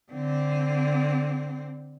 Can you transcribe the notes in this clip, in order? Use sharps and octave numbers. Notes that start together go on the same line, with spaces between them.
D3 C4